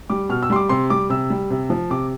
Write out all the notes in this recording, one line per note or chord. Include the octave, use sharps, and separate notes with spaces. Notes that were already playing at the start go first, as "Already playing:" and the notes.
G3 D6
B2 F6
E6
G3 C6
D6
C3 C6
G3 D6
C3 E6
G3
C3
F3
C3 D6